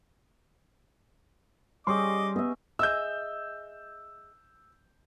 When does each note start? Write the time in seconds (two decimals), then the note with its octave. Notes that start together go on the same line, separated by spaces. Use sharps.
1.87 G3 C#4 G4 G#4 D#5 C6 D6
2.36 B3 D#5 E5
2.79 G#4 D#5 E5 E6 G6